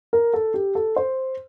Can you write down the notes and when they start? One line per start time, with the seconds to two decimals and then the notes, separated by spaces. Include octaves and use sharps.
0.13 A#4
0.33 A4
0.54 G4
0.75 A4
0.96 C5